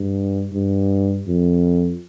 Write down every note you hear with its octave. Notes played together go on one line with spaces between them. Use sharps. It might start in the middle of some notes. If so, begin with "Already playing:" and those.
Already playing: G2
G2
F2